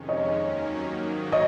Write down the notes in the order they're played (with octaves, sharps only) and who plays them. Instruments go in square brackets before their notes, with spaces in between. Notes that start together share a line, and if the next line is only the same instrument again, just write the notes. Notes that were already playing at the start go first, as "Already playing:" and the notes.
Already playing: [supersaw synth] F2 C3 D#3 G#3 C#4
[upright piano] C#5 D#5
[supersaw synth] D#2 D#3 F#3 A#3 C#4
G#2 D#3 F#3 A#3
[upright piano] C#5 D#5